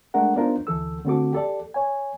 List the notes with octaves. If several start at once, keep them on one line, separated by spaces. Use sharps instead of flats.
G#3 A3 D4 A#4 F#5
B3 D4 D#4 F4 A#4 C5
D2 E3 A4 E6
D3 A3 C4 F#4 A4 D6
G4 A4 D5
C#5 G#5